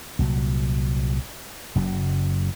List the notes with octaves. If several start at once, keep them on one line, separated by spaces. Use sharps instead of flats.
C2 A#2 F#3
F#1 C#3 F#3